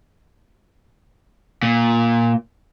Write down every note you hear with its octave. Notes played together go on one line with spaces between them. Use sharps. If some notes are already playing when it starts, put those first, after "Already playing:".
A#2